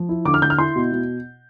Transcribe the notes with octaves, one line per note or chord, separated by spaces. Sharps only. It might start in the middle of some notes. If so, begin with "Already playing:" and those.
Already playing: F3
E4
D3 D6
F6
D3 G6
F6
E4 C6
B2
B2